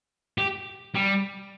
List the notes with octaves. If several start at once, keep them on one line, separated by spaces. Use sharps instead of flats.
G4
G3